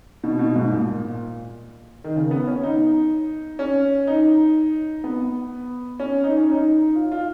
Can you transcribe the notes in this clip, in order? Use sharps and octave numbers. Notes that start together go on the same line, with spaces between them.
B2
B2
G#2
A#2
D#3
C#3
B3
C#4
D#4
C#4
D#4
B3
C#4
D#4
C#4
D#4
F4
F4